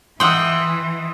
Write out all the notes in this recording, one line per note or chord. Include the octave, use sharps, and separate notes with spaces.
E3 D#5 E5 F#5 G5 C6 D#6